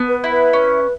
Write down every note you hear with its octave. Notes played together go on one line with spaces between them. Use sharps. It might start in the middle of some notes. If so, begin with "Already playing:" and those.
Already playing: B3
B4
E4
B4
C#4